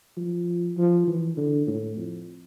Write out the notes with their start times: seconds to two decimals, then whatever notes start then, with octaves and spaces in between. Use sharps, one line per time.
0.17 F3
0.77 F3
1.07 E3
1.37 D3
1.67 A2
1.97 F2